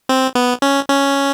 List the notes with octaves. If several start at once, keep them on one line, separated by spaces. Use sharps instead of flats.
C4
B3
C#4
C#4